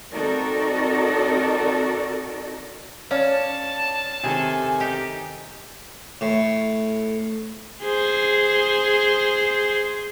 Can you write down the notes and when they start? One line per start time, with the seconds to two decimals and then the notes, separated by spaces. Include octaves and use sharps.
0.13 C4 D#4 F#4 A4 A#4 D5
3.11 C#4 D5 F5 A5 F6
4.24 C3 D#3 G#4 A4 G#5
4.80 D#4 G4
6.21 A2
7.84 G#4 C5